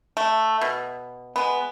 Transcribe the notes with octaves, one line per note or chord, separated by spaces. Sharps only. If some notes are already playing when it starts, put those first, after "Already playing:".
A3
B2
G#3 B3